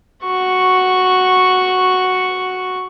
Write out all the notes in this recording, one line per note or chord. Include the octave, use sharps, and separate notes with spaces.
F#4 C#6